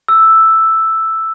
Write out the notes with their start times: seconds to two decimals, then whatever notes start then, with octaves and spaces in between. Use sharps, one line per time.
0.08 E6